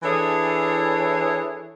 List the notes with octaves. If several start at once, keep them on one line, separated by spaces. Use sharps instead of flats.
E3 D4 E4 G#4 A4 C#5